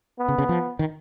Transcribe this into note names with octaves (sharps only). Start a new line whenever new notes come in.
B3
C#3
C#3
F3
D#3